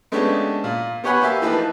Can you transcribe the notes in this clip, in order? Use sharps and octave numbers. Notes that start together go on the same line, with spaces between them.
G#3 A3 B3 C#4 D4 G4
A#2
B3 G4 C#5 F#5 G#5 B5
A#3 G4 E5 G#5
E3 F3 A3 A#3 D#4 B4